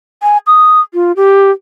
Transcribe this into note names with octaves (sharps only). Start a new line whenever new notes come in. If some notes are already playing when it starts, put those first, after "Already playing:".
G#5
D#6
F4
G4